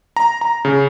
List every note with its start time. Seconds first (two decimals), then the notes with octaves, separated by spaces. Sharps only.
0.16 A#5
0.41 A#5
0.65 C#3